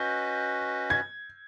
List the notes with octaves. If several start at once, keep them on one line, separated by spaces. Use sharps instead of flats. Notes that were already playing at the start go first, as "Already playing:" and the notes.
Already playing: C#4 F#4 B4 D#5 G6
G#6